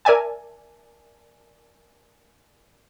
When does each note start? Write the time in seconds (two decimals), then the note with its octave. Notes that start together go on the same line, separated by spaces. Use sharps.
0.05 A#4 D5 E5 G#5 A5